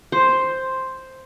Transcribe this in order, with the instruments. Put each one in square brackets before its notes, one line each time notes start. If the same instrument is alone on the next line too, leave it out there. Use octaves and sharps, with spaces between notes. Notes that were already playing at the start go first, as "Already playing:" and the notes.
[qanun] C5